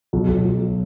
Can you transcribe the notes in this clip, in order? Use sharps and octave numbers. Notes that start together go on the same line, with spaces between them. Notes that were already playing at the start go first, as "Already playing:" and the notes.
B1
B1
B1